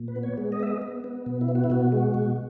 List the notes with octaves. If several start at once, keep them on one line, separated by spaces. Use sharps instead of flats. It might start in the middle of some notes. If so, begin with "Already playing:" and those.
Already playing: A#2
B4
B3
C#5
G#3
D#5
B3 E5
D#5
B3
B3
B2
E4
B3
F#4
E4
B2 F#4
G#3
B2